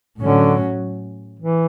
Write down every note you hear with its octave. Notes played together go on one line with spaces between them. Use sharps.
A2 D3 F#3 C#4
E3